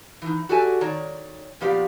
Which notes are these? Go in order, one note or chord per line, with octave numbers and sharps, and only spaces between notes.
E3 D#4
F#4 G4 A4 D5 E5 G#5
D#3 C#5 D5 A#5
A#2 F3 B3 G4 D5 F5